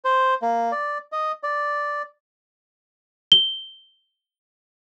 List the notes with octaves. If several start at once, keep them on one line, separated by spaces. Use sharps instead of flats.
C5
A#3
D5
D#5
D5
G7